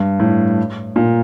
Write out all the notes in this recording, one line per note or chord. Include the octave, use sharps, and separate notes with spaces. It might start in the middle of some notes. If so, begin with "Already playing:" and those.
Already playing: G2
A2
A#2